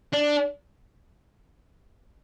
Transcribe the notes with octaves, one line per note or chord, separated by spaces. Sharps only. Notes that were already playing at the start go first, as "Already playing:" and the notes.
D4